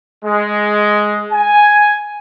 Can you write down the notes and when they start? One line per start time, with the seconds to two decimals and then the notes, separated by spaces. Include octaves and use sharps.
0.25 G#3
1.33 G#5